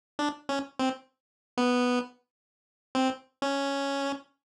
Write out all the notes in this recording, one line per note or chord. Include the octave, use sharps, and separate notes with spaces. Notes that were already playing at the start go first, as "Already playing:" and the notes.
D4
C#4
C4
B3
C4
C#4